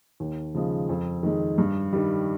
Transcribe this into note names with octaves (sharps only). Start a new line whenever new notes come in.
D#2
C#3 F3 G#3
F2
D#3 G#3
G2
D#3 G3